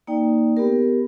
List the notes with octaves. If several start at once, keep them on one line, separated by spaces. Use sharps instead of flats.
A#3 D#4 D5 G5
B3 G4 A#4